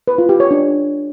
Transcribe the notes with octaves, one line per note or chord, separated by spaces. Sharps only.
B4
F4
G4
C#5
D4